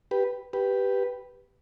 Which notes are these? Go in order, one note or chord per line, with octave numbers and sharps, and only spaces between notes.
G4 B4
G4 B4